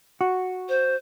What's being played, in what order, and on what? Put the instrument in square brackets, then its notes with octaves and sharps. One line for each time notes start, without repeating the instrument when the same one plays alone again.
[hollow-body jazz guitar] F#4
[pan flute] C5